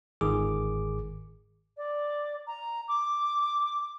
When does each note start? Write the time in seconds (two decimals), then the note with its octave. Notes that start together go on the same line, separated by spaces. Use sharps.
0.21 G1 G#2 D#3 G#4 D6
1.77 D5
2.47 A#5
2.88 D6